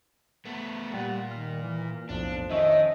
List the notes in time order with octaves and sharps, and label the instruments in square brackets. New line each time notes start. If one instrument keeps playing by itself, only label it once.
[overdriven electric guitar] A3 B3
[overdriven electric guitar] A#2 [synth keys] G3 F#5 A6
[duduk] D#3 [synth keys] F6
[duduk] E3
[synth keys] B1 F2 A2 [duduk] F3 [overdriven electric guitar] D4
[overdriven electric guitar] D#3 [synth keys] C#4 E5 D#7 [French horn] D#5